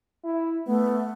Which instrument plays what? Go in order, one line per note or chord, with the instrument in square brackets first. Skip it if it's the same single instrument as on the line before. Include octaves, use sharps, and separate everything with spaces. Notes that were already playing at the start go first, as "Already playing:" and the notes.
[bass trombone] E4
[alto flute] A3 [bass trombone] B3